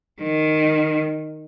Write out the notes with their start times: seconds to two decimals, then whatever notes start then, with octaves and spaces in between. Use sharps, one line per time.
0.22 D#3